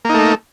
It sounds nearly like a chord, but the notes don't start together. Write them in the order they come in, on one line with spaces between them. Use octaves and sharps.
A#3 D#4 A3